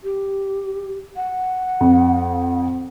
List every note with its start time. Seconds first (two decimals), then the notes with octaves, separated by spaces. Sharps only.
0.04 G4
1.16 F#5
1.81 F2